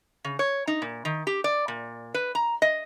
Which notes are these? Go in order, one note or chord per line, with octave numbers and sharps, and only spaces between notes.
C#3
C#5
D#4
A#2
D#3
G4
D5
A#2
B4
A#5
D#5